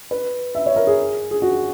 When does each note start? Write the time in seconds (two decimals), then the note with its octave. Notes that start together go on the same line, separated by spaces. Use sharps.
0.11 B4
0.55 E5
0.66 C#5
0.76 A#4
0.87 G#4
1.31 G#4
1.42 F#4